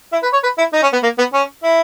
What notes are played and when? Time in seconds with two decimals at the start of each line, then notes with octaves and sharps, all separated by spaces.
0.12 E4
0.23 B4
0.33 C#5
0.43 B4
0.58 E4
0.73 D#4
0.82 C#4
0.93 B3
1.03 A#3
1.18 B3
1.33 C#4
1.63 E4